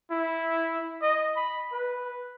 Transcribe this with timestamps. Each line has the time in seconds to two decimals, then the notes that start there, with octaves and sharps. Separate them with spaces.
0.11 E4
1.02 D#5
1.36 B5
1.73 B4